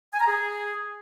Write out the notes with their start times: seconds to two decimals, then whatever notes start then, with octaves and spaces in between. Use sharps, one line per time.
0.13 G#5
0.20 A#5
0.27 G#4